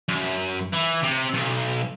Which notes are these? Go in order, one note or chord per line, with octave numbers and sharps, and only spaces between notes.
F#2
E3
C3
B1